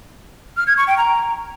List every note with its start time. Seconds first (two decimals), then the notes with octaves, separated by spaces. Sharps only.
0.57 F6
0.67 G#6
0.77 C#6
0.87 G5
0.97 A#5